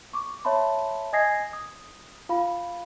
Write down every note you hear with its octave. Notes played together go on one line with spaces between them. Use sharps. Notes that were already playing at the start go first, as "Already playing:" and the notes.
C#6 D6
C#5 E5 A5 B5 C6
D#5 G#5 D#6 G#6 A#6 C7
D#6
F4 F5 B5